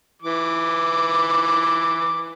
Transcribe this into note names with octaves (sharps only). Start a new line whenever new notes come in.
E3 D6